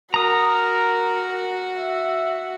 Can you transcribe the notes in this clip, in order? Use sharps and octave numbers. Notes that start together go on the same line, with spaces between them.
F#4 A#4 A#5 D#6
E5